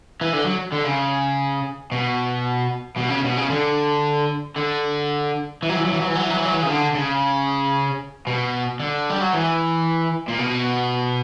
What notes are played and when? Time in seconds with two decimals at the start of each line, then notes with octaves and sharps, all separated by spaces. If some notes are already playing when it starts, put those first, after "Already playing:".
0.21 E3
0.33 D3
0.46 F#3
0.73 D3
0.85 C#3
1.92 B2
2.97 B2
3.10 C#3
3.25 B2
3.37 C#3
3.50 D3
4.56 D3
5.63 E3
5.69 F#3
5.77 E3
5.85 F#3
5.92 E3
6.00 F#3
6.07 E3
6.15 F#3
6.22 E3
6.30 F#3
6.37 E3
6.45 F#3
6.52 E3
6.62 C#3
6.68 D3
6.95 C#3
8.27 B2
8.80 D3
9.10 G3
9.21 F#3
9.33 E3
10.28 A#2
10.39 B2